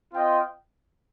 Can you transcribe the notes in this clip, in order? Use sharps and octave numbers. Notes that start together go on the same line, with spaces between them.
C4 F4 D#5 G5